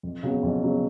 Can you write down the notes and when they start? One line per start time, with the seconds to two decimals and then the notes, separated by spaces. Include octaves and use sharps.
0.03 F2
0.23 C#3 F#3 B3
0.43 F2
0.63 C#3 F#3 B3